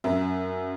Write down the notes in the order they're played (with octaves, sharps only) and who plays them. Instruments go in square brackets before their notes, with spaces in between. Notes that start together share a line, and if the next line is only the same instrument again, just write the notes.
[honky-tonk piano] F#2 E5